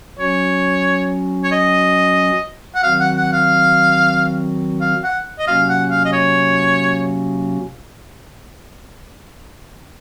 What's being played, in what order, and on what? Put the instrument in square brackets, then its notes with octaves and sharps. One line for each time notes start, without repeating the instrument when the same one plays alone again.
[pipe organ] F#3 C#4 F#4 [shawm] C#5
[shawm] C#5
D#5
F#5
[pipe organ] D#3 F#3 C4 F#4 [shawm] F5
[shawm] F#5
F#5
F5
F5
F#5
D#5
[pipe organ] C3 F#3 A#3 C#4 F#4 [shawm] F5
[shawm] F#5
F5
D#5
C#5